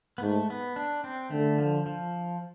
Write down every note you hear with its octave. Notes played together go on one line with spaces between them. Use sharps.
B3
G#2 A3
B3
D4
C4
D3 A3
F3
F3